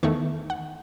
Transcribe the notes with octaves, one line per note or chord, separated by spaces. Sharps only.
E2 D#3 A3 C#6
F#5